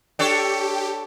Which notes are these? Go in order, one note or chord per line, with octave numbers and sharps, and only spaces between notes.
D4 G4 A4 C#5